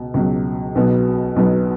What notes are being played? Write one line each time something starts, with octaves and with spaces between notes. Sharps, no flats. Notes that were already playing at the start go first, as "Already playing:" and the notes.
Already playing: C#2 B2
C#2 B2 F#3
B1 B2 F#3 B3
B1 B2 F#3 B3